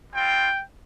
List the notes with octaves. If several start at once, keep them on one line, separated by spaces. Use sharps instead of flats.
G3 C4 F4 G5